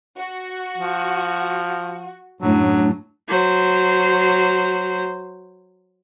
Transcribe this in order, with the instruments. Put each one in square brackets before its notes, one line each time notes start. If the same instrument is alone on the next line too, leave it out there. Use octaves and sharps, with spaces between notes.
[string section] F#4
[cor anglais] F3
[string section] F#2 A2 [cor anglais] F#3 [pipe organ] D4
[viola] F#3 C5